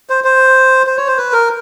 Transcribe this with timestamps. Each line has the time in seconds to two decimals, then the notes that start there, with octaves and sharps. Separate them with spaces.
0.10 C5
0.24 C5
0.87 C5
0.97 C#5
1.07 C5
1.17 B4
1.33 A#4